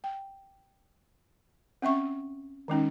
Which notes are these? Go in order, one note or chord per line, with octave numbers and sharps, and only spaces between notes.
G5
C4 C#4 E5 C#6
D#3 G#3 C#4 D#4